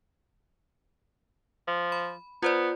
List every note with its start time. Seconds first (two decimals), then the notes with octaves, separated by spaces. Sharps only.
1.67 F3
1.92 B5
2.43 B3 F4 C5 D5